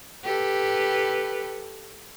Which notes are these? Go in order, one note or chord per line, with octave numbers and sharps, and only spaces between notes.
G4 A4 B4